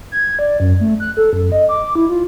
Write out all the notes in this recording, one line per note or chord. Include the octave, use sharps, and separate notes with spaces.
G#6
D5
F#2
A3
F#6
A4
F#2
D#5
D6
E4
F4